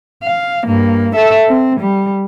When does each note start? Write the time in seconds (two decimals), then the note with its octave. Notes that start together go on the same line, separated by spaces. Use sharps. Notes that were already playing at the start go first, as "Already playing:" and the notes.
0.23 F5
0.65 G2 A#3
1.16 A4 E5
1.48 C4
1.80 G3